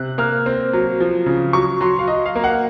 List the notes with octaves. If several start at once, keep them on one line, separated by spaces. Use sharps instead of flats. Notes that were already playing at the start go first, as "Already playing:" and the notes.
Already playing: C3 F#6
A#3 F6
C4
F#3
F3
C#3
F#3 C#6
F#3 C6
F5
F#3 D#5
F5
A#3
F#5